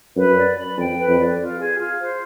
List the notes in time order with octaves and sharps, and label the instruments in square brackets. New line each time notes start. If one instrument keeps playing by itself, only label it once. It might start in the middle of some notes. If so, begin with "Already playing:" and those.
[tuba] F#2 [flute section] B4
[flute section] D5
B5
[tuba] F2 [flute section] G5
[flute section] B4
[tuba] F2
[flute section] D5
F4
G#4
F4
C5